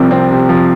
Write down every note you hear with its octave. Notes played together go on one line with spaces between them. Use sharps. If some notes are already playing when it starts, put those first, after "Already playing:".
Already playing: C2 C3 F3 C4
C4
C3
F3